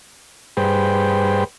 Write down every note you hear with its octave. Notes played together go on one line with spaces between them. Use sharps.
G2 G#4 B4 C5 G5